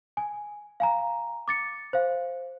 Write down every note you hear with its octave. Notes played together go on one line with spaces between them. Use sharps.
G#5
F5 G#5 A#5
D6 A6 C#7
C5 F5